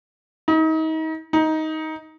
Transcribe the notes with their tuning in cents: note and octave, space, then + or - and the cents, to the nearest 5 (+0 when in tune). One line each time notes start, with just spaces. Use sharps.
D#4 +35
D#4 +15